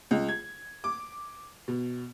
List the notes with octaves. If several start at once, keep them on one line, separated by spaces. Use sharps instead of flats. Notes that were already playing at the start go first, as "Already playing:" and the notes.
C#2
G#6
D6
B2